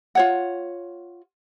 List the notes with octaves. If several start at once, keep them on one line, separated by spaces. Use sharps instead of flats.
F4 C#5 F#5